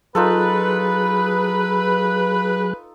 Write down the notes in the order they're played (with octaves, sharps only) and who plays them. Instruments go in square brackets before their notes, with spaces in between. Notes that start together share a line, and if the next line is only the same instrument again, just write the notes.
[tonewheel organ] F#3 G#4 F#6 [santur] D#4 F4 A4 [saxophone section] B4